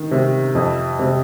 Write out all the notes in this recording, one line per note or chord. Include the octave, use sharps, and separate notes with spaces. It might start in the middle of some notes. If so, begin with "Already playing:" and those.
Already playing: D#3
C3
F2
C3